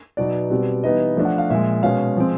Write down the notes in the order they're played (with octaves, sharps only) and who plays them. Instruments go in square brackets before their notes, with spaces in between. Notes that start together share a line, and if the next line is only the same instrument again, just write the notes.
[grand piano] B2 F#3 B3 D#4 D5
B2 G3 C4
E3 G3 B3 D#4 D#5
F3 A3 D4
F#5
F5
A#2 F3 G#3 E5
B2 G#3 C#4 F5
F3 G#3 C4